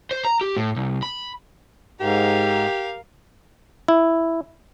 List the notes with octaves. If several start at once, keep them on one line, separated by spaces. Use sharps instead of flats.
C5
A#5
G4
A2
C2
B5
G#2 G4 A#4 F5
E4